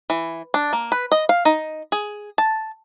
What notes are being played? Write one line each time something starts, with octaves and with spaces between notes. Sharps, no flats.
E3
D4
A#3
B4
D#5
F5
D#4
G#4
A5